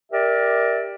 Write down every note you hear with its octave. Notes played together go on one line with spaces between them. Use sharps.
G4 A#4 D5 E5